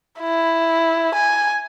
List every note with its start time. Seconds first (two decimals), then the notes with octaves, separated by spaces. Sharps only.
0.20 E4
1.15 G#5